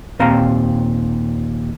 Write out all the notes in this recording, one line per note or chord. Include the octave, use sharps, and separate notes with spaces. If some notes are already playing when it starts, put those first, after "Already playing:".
D#2 A#2 C4 F5 A#5